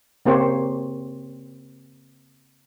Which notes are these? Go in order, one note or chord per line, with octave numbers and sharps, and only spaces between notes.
C#3 A#3 C4 G4 C5 C#5